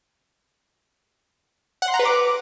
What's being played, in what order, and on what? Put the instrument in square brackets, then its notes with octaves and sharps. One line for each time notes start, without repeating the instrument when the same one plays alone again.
[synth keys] F#5
C6
A#5
B4
D6